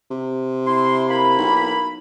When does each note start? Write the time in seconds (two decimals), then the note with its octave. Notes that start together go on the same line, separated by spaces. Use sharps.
0.11 C3
0.67 E4 C6
1.09 A#3 E4 B5
1.38 B1